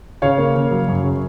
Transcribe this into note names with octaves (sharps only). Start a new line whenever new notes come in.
C#3 C#5 F5
A#3
C#3
F#3
F#2
C#3